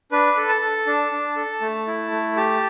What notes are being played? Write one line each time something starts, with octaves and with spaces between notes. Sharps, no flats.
D4 B4
A4
A5
A4
D4
D4
A4
A3
E4
A3
G4 A5